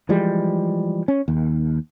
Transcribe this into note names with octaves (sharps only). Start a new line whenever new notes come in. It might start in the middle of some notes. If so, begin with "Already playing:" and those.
E3 F3 G3 G#3
C#4
D#2